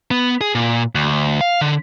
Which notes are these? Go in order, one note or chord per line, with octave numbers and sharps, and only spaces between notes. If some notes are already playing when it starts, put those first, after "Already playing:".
B3
G#4
A#2
D2
F5
D3